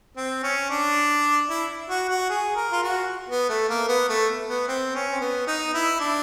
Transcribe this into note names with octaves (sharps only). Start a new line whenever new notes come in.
C4
C#4
D4
E4
F#4
F#4
G#4
A#4
F4
F#4
B3
A3
A#3
B3
A3
B3
C4
C#4
C4
B3
D#4
E4
D4